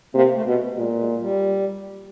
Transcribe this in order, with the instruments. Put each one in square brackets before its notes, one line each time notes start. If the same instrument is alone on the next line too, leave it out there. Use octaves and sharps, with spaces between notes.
[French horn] C3 [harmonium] A#3
[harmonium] A3
[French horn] B2
[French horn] A#2 [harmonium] G#3
[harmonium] G#3
G3